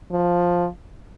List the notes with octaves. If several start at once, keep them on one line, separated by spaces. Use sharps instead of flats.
F3